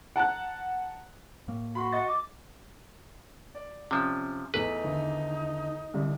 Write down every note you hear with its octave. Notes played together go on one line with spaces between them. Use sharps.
F#5 A5 A#5 F#6
A2 A#3
F#4 B5 C6
D#5 F#5 A6
D6
D5
C3 F3 C#4
E2 A3 D#4 A4 B4
D3 D#3 E5
C2 D3